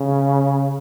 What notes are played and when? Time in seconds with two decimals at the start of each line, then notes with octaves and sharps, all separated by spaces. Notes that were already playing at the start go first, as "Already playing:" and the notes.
Already playing: C#3